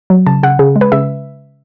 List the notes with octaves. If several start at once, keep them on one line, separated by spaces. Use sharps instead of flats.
F#3
C#3 A5
C#3 F#5
C#3 G#4
G#3
B4
C#3 E5